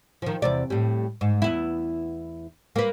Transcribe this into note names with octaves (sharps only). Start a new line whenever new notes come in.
D#3 F3
E2 C3 D5
A2 G3
G#2
E2 B3 E4
A#3 B4